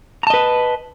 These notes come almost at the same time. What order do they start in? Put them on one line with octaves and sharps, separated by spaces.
A#5 A5 D#5 B4